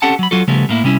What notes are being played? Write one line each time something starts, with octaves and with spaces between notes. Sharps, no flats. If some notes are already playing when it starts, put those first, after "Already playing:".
C4 C#4 G4 A4 F#5 A5
F#3 B5
F#3 F4 F#4 A4
C#3 F3 G3 A3 B3
A2 A#3 E4
C3 G3 C#4 E4